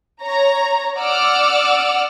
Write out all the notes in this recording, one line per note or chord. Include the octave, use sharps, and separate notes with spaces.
C#5 A#5
D5 F#5 D6 E6 F6